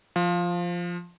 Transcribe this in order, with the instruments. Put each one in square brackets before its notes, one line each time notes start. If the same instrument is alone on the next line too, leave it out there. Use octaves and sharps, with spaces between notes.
[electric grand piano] F3